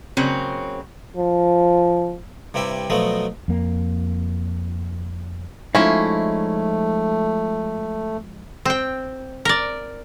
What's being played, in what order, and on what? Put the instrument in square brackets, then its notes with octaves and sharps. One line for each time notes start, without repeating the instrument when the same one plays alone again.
[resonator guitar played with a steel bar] C#3 F#3 A#3 C4
[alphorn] F3
[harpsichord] G2 C3 G3 E4 E5
B2 F3 F#3 A3 B3
[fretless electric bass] F2 A#3
[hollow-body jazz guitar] F3 G#3 D#4 [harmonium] A3 [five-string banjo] C#4 E4
[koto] C4 G5
A#4 D5